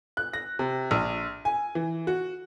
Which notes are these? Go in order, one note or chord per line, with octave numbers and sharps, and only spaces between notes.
F#6
A#6
C3
A#1
G#5
E3
F#4